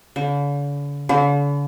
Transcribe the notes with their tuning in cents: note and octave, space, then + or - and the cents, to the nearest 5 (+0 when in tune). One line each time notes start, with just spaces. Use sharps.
D3 -45
D3 -45